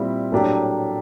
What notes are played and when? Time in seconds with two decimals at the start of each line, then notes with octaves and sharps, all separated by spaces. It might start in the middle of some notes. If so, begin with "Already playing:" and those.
Already playing: A#2 G3 C4 E4
0.32 A2 F#3 A#3 D4 G4